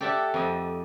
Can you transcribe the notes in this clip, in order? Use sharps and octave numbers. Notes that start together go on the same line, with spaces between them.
G4 A4 D5 E5 F#5
F2 D#5